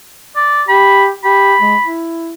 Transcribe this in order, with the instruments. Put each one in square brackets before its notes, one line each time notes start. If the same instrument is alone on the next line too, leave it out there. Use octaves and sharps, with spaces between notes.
[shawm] D5
[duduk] G4 [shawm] B5
[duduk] G4 [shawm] B5
[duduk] G#3
E4